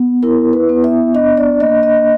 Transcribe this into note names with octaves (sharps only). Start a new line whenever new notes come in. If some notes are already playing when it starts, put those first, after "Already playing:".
Already playing: B3
E4 A#4
B4
B3
E5
D4 D#5
D5
A#3 D#5
D#5